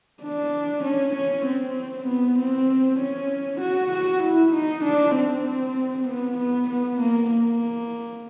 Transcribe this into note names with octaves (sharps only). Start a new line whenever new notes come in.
D4
C#4
C#4
C4
B3
C4
C#4
F#4
F#4
E4
D#4
D4
C4
B3
B3
B3
A#3
A#3